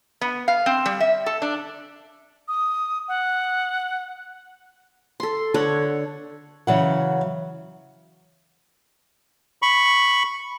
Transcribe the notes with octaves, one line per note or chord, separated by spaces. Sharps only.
B3
F5
C4
G3
E5
A4
D4
D#6
F#5
A4 C6
D3 A4 C#5 F#5
C#3 E3 F#3 F#5
B5 C#6